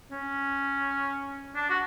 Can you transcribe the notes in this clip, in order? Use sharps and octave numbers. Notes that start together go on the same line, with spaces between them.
C#4
D4
F#4